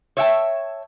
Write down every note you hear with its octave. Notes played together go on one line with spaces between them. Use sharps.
C#5 D5 E5 F#5 G5 A5